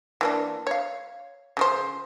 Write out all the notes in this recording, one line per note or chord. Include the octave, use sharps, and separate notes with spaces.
E3 A#3 D4
C#5 F5
C#3 F3 C5